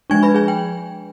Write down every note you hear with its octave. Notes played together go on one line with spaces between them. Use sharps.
F3 G#3 D4 G#5 G#6
B4 B5
G#4 G#5
G5